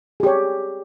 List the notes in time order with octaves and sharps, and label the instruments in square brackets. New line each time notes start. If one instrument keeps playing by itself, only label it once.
[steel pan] G#4
G4
C#5